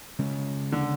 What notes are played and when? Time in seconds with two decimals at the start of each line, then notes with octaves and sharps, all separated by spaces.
0.19 C#3 G#3 C#4
0.72 D3